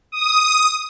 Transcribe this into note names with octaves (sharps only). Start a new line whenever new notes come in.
D#6